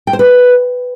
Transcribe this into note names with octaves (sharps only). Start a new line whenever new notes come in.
G5
C5
B4